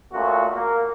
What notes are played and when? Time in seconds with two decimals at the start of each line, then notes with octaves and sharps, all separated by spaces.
0.13 C#2 A#2 A3 F4 F#4
0.55 A#3